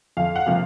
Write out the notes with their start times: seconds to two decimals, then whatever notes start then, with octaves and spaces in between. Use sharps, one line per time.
0.17 F2 F5
0.36 F#5
0.46 C3 F3 A#3 F5